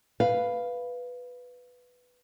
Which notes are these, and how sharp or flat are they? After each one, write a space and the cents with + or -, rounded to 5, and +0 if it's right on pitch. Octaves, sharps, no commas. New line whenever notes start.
B4 +0 F5 +0